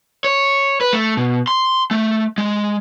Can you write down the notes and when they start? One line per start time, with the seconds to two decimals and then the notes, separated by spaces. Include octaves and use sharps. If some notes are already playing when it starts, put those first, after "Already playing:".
0.24 C#5
0.81 B4
0.93 A3
1.17 B2
1.47 C6
1.91 A3
2.38 G#3